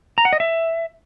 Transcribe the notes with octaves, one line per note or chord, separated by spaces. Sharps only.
A#5
F#5
D#5
E5